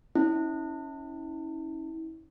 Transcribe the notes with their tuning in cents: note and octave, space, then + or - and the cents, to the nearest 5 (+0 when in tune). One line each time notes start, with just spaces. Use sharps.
C#4 +0 E4 -35